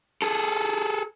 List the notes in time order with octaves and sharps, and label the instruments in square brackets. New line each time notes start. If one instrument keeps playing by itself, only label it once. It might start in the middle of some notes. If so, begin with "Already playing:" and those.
[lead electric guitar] G#4 A4